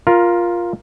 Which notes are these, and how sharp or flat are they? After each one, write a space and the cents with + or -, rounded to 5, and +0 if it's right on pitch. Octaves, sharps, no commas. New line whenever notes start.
F4 +0 A#4 +15